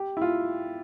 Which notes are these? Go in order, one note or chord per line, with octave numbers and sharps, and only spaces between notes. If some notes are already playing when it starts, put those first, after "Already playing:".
Already playing: G4
E4
F4